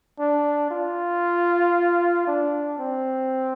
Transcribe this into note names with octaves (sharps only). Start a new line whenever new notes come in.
D4
F4
D4
C4